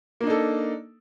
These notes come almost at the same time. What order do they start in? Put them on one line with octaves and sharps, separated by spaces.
A#3 D4 D#4 A4